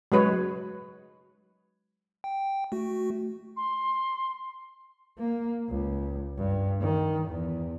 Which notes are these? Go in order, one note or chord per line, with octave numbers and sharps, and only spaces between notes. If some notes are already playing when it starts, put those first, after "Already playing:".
F#3 G#3 B4 C#5
G5
A3 F#4
C6
A#3
C#2
G2
D#3
E2